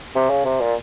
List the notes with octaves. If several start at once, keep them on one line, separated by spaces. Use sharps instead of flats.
C3
C#3
C3
A#2